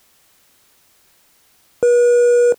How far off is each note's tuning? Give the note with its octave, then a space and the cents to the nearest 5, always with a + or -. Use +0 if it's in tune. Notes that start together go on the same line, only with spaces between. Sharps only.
B4 -40